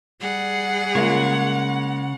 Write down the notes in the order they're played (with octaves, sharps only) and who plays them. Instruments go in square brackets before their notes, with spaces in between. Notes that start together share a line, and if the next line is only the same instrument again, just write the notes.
[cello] G3 G#4 [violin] F#5
[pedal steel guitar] C#3 C#5 [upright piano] G#3 A#3 F4